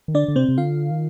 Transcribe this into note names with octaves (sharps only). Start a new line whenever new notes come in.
D#3
D3 D4 D5
D3
C3 C4 C5
C3
D3 F4 F5
D#3